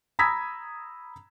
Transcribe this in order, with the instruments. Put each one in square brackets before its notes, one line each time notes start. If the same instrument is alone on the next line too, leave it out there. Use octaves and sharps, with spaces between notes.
[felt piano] A#5 B5 D#6 E6 G#6 B6